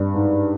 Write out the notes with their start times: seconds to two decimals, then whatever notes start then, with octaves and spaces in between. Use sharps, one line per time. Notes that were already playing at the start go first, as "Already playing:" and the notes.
Already playing: G2
0.14 G#2